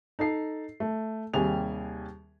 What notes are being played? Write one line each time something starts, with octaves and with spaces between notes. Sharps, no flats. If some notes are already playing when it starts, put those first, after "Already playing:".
D#4 A4 C7
A3
D#2 C3 G3 G#4 G#5 F7